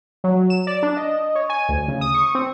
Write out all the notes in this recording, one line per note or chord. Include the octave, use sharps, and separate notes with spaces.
F#3
E7
D5
D4
D#5
C#5
G#5
D2
C#3
D#6
C#6
C4